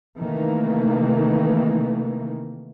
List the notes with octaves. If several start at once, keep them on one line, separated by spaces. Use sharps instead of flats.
C3 D#3 E3 A3 A#3